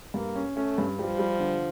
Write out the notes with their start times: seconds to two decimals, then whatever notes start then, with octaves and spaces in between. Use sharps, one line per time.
0.14 G2 A#3
0.35 C#4
0.56 A3 C#4
0.78 G2
0.99 F3 G3
1.19 G3
1.40 D3